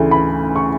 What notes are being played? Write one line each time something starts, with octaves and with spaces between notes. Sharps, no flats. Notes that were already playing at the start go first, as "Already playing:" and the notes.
Already playing: D2 C#3 E3 A3 E4
B5
C#6